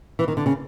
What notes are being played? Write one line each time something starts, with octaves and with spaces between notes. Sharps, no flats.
E3
D#3
D3
C#3